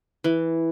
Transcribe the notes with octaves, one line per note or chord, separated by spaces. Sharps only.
E3